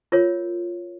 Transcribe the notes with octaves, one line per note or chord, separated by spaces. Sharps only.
F4 A#4 C#5